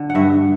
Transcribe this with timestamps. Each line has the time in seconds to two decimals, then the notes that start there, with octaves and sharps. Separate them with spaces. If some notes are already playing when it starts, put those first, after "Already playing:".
Already playing: D3
0.10 F#5
0.15 G2 E5